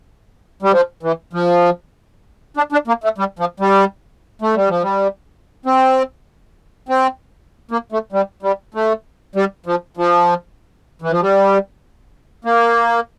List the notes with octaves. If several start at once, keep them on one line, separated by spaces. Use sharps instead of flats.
G3
F3
E3
F3
D4
D4
A#3
A3
G3
F3
G3
A3
G3
F3
G3
C4
C4
A#3
A3
G3
G3
A3
G3
F3
F3
E3
F3
G3
A#3